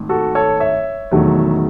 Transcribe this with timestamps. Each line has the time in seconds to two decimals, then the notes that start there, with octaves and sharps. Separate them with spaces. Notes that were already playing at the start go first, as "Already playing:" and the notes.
Already playing: G#1 G#2 D#3 A3
0.09 F#4 A4
0.35 A4 C#5
0.60 C#5 E5
1.11 E1 E2 D#3 F#3 A3